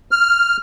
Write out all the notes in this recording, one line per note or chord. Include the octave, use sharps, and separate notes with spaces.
F6